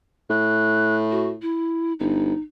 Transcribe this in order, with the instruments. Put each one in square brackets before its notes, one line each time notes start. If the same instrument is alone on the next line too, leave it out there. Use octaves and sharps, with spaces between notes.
[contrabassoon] A2 [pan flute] F#6
[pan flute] F#4
E4
[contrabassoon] G1 [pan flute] D#4